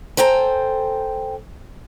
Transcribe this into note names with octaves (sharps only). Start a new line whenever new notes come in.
A4 C5 G5 G#5 A#5